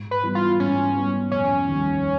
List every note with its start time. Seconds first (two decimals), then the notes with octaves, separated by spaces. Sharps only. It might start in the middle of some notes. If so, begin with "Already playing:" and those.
Already playing: G#2
0.11 B4
0.23 E3 G3 B3
0.35 F4
0.59 G#2 C#4
0.95 E3 G3 B3
1.32 F1 C#4
1.68 D#2 D#3 G3